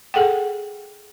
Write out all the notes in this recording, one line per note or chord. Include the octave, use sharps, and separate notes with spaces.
G#4 A4 F#5 G5